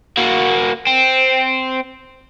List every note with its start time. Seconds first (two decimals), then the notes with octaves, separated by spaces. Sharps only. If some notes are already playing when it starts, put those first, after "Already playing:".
0.18 A#3 F#4
0.87 C4